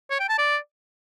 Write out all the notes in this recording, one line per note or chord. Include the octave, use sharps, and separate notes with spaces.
C#5
G5
A5
D5